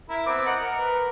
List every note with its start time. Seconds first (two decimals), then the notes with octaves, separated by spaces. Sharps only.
0.10 E4 A#4
0.26 B3 C4 D6
0.46 A#4 D#5 F#5
0.60 A#4
0.77 B4